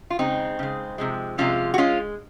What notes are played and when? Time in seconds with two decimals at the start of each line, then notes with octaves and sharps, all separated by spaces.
0.10 F4
0.19 C#3 G#3 C4 D#4
0.59 C#3 G#3
0.98 C3 F3 G#3
1.38 C3 F3 G#3 C#4 F4
1.74 F#4
1.78 G#3 C#4 F4